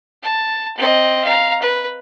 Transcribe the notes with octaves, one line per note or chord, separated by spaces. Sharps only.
A5
C4 D#5
F5 A#5
B4